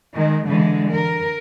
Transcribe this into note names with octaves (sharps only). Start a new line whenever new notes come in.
D#3 G#3
D3 E3 G#3
A#4